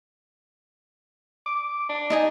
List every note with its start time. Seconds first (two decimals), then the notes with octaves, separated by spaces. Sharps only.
1.46 D6
1.89 D4
2.10 D#4 D#5 G#5